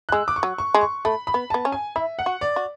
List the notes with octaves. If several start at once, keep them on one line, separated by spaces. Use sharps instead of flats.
F#6
G#3 E6
D6
C#6
F#3
C#6
G#3
C#6
A3 B5
B5
B3
B3 A5
C#4
G#5
E4 E5
F#5
F#4
D5
F#4